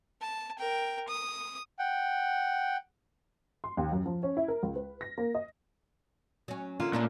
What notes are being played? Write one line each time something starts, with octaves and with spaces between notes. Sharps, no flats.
A5
A#4 G5
D#6
F#5 G5
C6
D#2
F#2
F3
C#4
E4
A#4
C#2
B4
A#6
A#3
D#5
F#3 C#4
D3 A#3 C#4 F4
A#2 A3 D4 E4